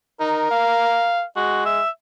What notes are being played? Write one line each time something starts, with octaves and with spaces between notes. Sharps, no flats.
D#4 A#4
F5
G#3 F#4
E5